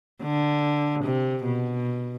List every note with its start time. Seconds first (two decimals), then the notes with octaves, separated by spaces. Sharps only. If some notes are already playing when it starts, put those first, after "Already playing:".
0.23 D3
1.05 C3
1.45 B2